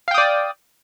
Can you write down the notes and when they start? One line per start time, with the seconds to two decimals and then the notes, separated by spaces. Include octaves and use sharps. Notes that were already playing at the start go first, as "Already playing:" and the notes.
0.08 F5
0.11 G5
0.14 D#6
0.18 D5